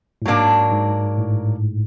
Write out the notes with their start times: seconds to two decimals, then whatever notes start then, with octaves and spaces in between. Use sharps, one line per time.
0.22 A2
0.26 G#2 F#3 A#3 D4
0.72 G#2
1.17 A2